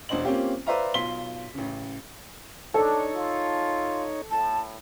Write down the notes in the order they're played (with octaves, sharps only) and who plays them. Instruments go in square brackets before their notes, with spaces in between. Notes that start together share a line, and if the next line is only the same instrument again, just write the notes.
[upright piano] E1 D4 C5 D#5 F#7
A#3 C4 C#4 F4 G4
B4 C5 D5 E5 F5 A#5
B1 F4 C6 B6 G7
A1 C#3
[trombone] D4 [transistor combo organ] D#4 C#5 [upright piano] A4
[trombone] F4
[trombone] A2 [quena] A5